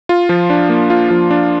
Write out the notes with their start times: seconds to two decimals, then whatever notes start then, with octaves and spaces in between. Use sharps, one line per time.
0.09 F4
0.29 F3
0.50 D4
0.70 A#3
0.90 F4
1.10 F3
1.31 D4